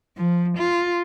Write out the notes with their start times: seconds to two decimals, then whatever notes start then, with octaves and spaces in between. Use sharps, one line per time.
0.18 F3
0.58 F4